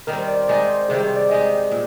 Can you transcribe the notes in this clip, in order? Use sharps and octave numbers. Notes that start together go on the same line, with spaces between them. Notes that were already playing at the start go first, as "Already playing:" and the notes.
D#3 G3 C4 A#4
C5
D5
C5
D#3 G#3 D#4 D5
C5
C3 D#3 G3 G#4
C5
D5
D#3 G#3 D#4 G4 D#5
A#2